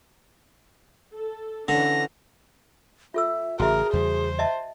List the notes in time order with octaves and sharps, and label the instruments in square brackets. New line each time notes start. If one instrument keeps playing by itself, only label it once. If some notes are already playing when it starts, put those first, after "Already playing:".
[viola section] A4
[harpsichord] D3 [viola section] E3 C#4 D4 [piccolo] A#6
[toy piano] F4 A4 E6 [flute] E5
[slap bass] A1 C#3 [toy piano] F#4 E5 [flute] G#4 [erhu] A#4
[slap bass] E2 C#3 G3 [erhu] C5
[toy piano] D#5 E5 A5